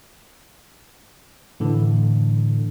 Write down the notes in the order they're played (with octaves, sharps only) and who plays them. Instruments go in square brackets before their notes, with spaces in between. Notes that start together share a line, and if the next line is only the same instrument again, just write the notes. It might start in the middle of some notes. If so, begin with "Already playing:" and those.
[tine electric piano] A2 D3 E3